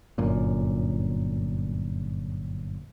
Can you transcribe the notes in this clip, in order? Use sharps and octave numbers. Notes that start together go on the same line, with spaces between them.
G1 F#2 A#2